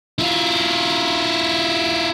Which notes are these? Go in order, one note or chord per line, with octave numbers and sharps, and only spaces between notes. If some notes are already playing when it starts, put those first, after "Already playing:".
E4 F4